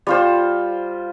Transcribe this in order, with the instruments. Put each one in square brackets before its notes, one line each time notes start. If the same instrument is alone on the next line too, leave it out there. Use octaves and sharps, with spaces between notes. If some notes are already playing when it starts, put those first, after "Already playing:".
[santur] G3 F4 C5